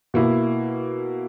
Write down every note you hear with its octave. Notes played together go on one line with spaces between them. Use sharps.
B2 A#3 E4